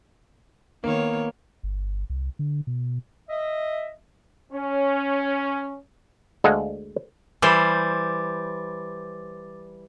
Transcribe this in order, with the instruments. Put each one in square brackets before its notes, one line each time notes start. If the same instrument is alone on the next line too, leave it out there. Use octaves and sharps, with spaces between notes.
[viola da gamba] D#3 B3 C#5 [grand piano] A#3
[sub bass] G1
C2
D3
B2
[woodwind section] D#5 E5
[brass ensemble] C#4
[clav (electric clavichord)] D2 G#3 A4 D#5 F5 F#5
[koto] E3 G3 C5 [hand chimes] D6 A6